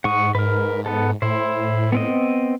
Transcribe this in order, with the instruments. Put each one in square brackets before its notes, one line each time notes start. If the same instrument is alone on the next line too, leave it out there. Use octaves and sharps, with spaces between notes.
[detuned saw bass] G#2 [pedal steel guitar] F#5 C#6 D#6
[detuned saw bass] G#2 [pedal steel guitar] A#4 B4
[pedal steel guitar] B3 A4
[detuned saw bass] A2 [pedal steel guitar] E4 C5
[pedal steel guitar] B3 C4 D#5